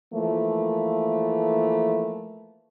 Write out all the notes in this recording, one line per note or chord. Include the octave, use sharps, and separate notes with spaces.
E3 F3 A3 A#3